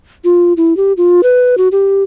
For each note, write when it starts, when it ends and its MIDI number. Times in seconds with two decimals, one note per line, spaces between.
0.24 0.53 65
0.57 0.76 64
0.77 0.93 67
0.97 1.21 65
1.23 1.55 71
1.58 1.68 66
1.72 2.03 67